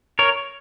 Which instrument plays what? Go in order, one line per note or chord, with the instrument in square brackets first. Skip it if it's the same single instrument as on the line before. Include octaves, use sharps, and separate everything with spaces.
[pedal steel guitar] A#4 C#5